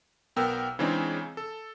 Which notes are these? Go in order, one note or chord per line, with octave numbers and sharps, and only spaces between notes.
B1 B3 A#4 G5 E6
C#3 E3 G#3 C4 D4 D#4
A4